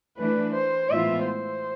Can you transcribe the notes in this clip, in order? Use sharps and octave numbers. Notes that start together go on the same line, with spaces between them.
E3 A3 D4 B4
C5
A2 E3 G#3 B3 F4 E5
C5